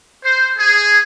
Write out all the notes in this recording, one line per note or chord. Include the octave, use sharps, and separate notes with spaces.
C5
G#4